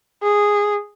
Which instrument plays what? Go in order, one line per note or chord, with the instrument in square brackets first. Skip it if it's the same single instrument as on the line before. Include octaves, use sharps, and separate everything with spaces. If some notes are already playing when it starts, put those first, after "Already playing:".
[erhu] G#4